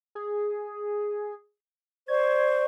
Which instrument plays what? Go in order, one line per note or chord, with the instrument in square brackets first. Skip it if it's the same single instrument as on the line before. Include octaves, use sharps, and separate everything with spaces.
[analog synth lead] G#4
[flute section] C5 D5 C#6 [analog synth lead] G#6